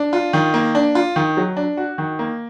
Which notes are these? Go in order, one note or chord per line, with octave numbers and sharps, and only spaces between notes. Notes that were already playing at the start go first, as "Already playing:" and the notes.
Already playing: D4
F4
D#3
A#3
D4
F4
D#3
F#3
D4
F#4
D#3
A#3